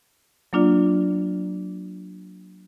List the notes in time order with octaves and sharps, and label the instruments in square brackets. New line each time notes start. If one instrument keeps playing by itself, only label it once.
[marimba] F#3 A#3 D4 F4 D5